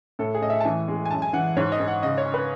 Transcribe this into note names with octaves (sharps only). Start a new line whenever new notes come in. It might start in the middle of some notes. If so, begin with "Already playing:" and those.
A2 A4
G#4
A2 D#5
E5
A5
E3 G#5
G#3
G#5
F#2 A5
G#5
E3 F#5
G#2 C#5
D#5
G#2
F#5
C#3 D#5
C#5
C#4
B4